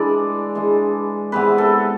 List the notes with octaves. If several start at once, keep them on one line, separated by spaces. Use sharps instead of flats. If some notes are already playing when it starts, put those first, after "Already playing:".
Already playing: E3 G#3 D4 D5
E3 G#3 D4
C3 E3 G#3 B3 B4
A4